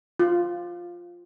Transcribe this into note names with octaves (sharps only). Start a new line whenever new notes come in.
F4